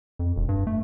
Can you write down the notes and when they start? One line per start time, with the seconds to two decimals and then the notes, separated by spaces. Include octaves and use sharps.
0.19 F2
0.36 E1
0.49 G2
0.67 A3